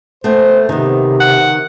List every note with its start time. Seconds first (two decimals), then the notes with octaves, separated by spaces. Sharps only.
0.24 A3 B3 C4 C5
0.69 C3 D#3 B3
1.20 F#5